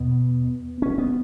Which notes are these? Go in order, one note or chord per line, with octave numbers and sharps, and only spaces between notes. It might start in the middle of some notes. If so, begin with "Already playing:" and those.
Already playing: E2 B2 B3
C#4
B3